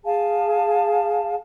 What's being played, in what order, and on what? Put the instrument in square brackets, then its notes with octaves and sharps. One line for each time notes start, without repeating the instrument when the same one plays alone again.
[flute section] G#4 F5 G#5 A5